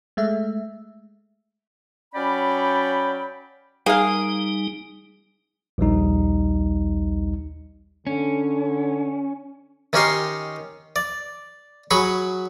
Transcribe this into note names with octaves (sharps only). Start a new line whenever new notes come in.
G#3 A3 E5
F#3 C#4 D5 G5 B5
G3 A#3 D#4 G#4 F5
A#1 D#2 G3 D#4
D3 C#4
D#3 C#4 D#4 G4 C#5 C6
D5
F#3 G#4 B5 C#6